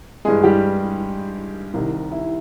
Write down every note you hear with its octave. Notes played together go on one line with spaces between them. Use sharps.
G2 E3 G#3 G#4
G3 G4
C2 C3 D#3
E4